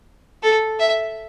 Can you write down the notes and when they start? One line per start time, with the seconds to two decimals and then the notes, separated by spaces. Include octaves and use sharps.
0.43 A4
0.79 E5